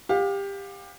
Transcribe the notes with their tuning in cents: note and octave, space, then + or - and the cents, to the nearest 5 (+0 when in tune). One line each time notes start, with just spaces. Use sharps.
G4 +20 F5 +35